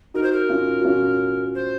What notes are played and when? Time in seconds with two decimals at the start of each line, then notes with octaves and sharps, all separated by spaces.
0.14 D#4 F#4 A#4
0.23 C5
0.33 A#4
0.49 C#4 F4
0.81 F#4
0.85 C#4 F4
1.55 C5